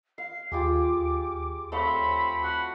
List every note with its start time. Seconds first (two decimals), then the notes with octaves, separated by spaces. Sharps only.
0.18 F5 C7
0.52 D#2 F4 G4 G#4 D6
1.72 A3 C4 C#5 F5 B5
2.44 F#4